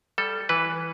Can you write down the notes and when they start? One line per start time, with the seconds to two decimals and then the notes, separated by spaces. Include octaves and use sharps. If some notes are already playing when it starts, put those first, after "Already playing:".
0.18 G3 A4
0.49 E3 B4